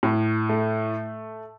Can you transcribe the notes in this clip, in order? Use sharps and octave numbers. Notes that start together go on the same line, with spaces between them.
A2
A3